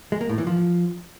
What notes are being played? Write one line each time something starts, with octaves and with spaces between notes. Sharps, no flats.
G#3
A#3
A2
E3
F3